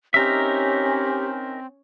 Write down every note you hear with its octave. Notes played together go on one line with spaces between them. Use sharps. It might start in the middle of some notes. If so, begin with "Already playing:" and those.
C4 C#4 D#4 G4 A#4 E5